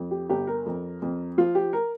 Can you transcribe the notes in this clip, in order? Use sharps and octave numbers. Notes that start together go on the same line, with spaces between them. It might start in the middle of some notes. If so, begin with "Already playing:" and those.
Already playing: F2
G4
G1 G4
A#4
F2
F2
F3 F4
G4
A#4